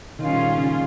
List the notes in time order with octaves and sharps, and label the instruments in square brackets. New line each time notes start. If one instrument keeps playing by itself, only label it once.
[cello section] A#2 G3 C#4 F4 G#4 [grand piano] D#3
[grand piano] C#3